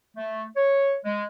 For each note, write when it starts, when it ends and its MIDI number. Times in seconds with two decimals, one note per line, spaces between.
0.16 0.44 57
0.56 0.94 73
1.05 1.24 56